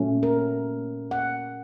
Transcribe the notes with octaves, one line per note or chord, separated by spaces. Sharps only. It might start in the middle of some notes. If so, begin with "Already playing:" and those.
Already playing: A#2 F#3 A3 C#4
A#4
F#5